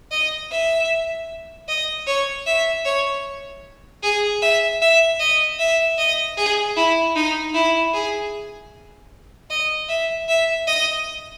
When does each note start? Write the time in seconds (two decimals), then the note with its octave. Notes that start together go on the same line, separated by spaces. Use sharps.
0.12 D#5
0.52 E5
1.69 D#5
2.07 C#5
2.47 E5
2.85 C#5
4.03 G#4
4.42 E5
4.82 E5
5.20 D#5
5.59 E5
5.99 D#5
6.37 G#4
6.77 E4
7.16 D#4
7.55 E4
7.94 G#4
9.51 D#5
9.89 E5
10.29 E5
10.68 D#5